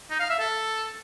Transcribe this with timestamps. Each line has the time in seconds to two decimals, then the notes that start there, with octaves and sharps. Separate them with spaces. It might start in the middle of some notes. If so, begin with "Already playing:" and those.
0.10 D#4
0.20 F5
0.30 E5
0.40 A4